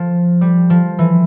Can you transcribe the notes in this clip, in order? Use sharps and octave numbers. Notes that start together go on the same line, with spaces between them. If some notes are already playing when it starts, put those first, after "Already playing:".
Already playing: F3
G3
F3
E3